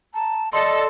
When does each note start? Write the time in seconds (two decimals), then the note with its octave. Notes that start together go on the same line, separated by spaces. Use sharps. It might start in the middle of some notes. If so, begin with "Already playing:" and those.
0.14 A5 A#5
0.53 A4 D5 D#5 C6